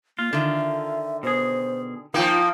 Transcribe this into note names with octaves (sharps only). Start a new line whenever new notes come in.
A#3 F4
D3 D#3 E5
B2 G#4 C5
F3 A#3 D#4 F4 G5 G#5